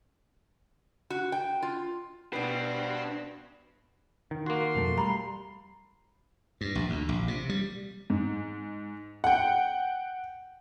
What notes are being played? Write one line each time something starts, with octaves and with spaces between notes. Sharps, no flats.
F#4
G5
F4
B2 B3 C4 D4 B4
D#3
A#3 F#4 C6
B1 F2 A3
G3 A#5 B5
G2
A#1
D2
A#1
C3
G3
G#2
F#5 G5